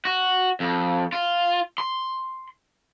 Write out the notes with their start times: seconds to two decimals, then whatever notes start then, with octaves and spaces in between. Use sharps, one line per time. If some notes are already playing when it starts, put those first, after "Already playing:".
0.05 F#4
0.60 F2
1.13 F4
1.78 C6